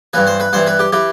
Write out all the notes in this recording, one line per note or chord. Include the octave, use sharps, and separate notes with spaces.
G2 E3 B4
C5
B4
G2 E3 C5
B4
G4
E3 G4